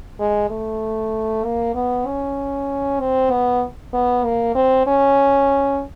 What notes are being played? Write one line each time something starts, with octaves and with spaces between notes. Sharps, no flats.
G#3
A3
A#3
B3
C#4
C4
B3
B3
A#3
C4
C#4